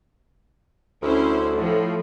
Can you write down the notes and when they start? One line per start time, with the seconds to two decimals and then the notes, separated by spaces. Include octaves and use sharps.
1.02 D2 C#4 E4 C5
1.55 A2 F3